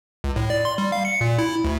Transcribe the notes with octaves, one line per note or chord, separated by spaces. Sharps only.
C#2
A2
D5
C6
G3
F5
C#7
A#2
E4
D2